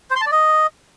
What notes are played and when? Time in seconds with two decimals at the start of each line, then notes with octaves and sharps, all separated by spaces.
0.11 C5
0.16 C6
0.21 A5
0.26 D5
0.32 D#5